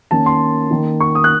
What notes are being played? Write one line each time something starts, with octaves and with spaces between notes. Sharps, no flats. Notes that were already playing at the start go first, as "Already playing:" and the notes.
D#3 A#3 C#4 A5
C6
D#3 A#3 D#4
C#6
D#6
F#6